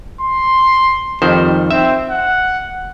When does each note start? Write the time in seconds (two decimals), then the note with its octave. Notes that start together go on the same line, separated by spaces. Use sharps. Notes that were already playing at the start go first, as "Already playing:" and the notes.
0.21 C6
1.22 F2 D#3 G3 C5
1.71 C4 E5
2.10 F#5